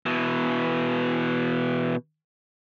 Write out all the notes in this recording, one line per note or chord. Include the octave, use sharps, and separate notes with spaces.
B2 E3